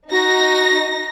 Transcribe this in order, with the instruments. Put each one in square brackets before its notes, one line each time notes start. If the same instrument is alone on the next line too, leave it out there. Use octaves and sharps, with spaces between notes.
[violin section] D#4 A#6 [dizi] F#4